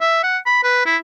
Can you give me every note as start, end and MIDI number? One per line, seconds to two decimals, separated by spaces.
0.01 0.22 76
0.23 0.38 78
0.46 0.59 83
0.63 0.85 71
0.86 0.97 64